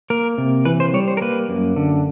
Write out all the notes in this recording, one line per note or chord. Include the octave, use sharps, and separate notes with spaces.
A#3 A#4
C3
E3 B4
C5
G3 C#5
C5
A#4
A#3 B4
F#2
D3